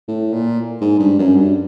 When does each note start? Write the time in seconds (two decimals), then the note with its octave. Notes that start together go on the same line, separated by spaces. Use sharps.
0.08 A2
0.33 A#2
0.81 G#2
1.00 G2
1.19 F#2
1.37 G2